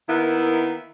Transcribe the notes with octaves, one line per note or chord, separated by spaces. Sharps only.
D#3 A#3 B3 E4